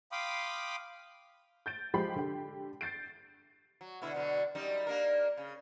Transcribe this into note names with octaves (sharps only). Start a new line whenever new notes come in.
F5 G5 B5 C6 D6 D#6
G6 A6 D7
F3 G#3 G4 B5 C7
D3 G4
G6 A6 C7 D7
F#3
B2 D3 E4
B2 D3 F#3
F#2 G3 D#4
A#3 D4 A#4
C#3